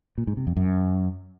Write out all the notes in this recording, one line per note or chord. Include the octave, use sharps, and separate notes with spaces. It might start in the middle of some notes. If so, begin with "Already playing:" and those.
A#2
G#2
C3
F2
F#2